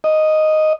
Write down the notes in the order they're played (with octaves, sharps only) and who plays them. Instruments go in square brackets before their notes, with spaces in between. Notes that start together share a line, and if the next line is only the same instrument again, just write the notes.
[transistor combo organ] D#5